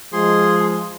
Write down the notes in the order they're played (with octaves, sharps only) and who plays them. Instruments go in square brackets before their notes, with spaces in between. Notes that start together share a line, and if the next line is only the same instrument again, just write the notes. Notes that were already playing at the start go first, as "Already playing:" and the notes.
[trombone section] F3 G#3 [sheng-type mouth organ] G#4 C6